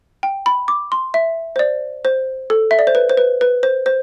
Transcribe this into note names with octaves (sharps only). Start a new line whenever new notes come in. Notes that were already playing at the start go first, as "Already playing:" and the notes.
G5
B5
D6
C6
E5
C5
D5
C5
A4
E5
D5
C5
B4
C5
B4
B4
C5
C5